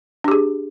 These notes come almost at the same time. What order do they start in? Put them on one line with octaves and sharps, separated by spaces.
D4 G4 G#4